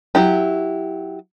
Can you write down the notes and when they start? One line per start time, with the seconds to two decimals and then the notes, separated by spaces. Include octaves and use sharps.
0.15 F#3 E4 G4